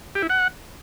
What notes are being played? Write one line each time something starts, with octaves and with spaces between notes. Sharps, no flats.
G4
E4
F#5